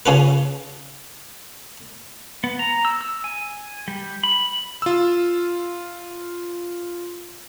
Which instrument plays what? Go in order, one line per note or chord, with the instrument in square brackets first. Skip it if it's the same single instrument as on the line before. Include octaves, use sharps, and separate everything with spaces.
[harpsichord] C#3 C#4 F4 B4
[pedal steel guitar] B3
A#5
E6
E6
G#5
G3
B5
[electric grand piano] F4 E6